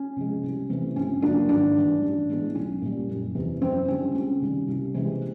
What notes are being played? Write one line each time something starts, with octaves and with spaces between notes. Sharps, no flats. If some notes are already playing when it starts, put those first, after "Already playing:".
Already playing: C#4
C3 F3 G#3
C2
C3 E3 A3 C4
G1 C#4
G2 D3 F#3 A#3 D4
G#1 D4
G2 E3
A1
A2 E3 G#3 B3
B1 C#4
A#2 G3
F#1
E2 C3
F#2 C4
D3 G3 C4 C#4
C#2 C#4
C3 D#3 G3
C2
C3 E3 G#3 C4